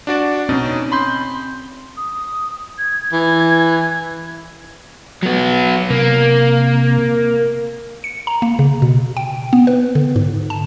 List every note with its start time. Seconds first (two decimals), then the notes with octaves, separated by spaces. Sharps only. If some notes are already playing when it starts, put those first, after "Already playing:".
0.07 D4 F#4 D5
0.49 B2 C4 C#4 D#4
0.92 B5 C6 G6
1.97 D#6
2.78 G#6
3.12 E3
5.22 F#3 B3
5.90 C3 A#3
8.04 C#7
8.27 A#5
8.42 A#3
8.59 C#3
8.82 B2
9.17 G5
9.53 B3
9.67 B4
9.95 D3
10.16 G#2
10.50 A5